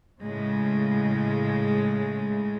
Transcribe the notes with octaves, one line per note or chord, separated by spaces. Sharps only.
A2 C#3 G#3